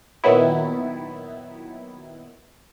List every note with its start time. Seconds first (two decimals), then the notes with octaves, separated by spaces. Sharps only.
0.24 A#2 D#3 F#3 B3 E4